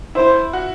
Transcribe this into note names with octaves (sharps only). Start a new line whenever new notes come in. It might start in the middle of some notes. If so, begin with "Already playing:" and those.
E4 C5
F#4